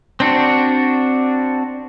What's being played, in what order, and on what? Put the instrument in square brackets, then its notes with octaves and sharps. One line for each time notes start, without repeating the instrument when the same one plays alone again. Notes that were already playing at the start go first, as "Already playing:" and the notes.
[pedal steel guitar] C4 D4 F#4